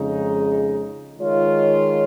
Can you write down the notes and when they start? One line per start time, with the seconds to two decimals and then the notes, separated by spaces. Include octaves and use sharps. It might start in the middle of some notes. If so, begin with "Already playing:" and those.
Already playing: F2 C#3 G#3 D#4
1.17 D#3 G#3 F4 C#5